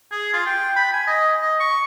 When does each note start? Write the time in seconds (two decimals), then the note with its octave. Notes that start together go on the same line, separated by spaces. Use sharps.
0.12 G#4
0.33 F4
0.46 G5
0.76 B5
0.93 G#5
1.07 D#5
1.42 D#5
1.60 C#6